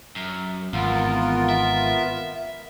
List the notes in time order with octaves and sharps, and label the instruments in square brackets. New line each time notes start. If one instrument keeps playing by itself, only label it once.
[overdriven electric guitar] F#2
[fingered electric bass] G#1 [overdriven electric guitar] E2 [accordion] B3 F4 A#4
[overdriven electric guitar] E5